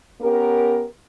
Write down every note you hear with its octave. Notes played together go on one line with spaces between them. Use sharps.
B3 C#4 G4 A#4